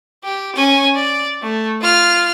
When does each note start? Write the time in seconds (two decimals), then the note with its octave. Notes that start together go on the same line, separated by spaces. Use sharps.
0.24 G4
0.55 C#4 G#5
0.96 D5
1.42 A3
1.82 F4 F6